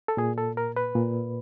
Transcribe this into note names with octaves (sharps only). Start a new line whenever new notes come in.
A4
A#2 G#4
A4
A#4
B4
A#2